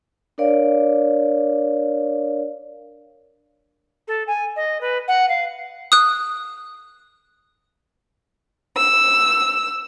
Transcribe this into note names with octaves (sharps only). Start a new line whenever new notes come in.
D4 A#4 C#5 D5 F5
A4
G#5
D#5
B4
F#5
F5
D#6 F#6
E6